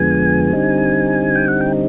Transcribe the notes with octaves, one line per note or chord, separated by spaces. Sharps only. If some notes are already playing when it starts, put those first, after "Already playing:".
Already playing: F2 D3 F3 G#3 B3 G#5
D3 G3 C4 D#4
G5
F#5
G5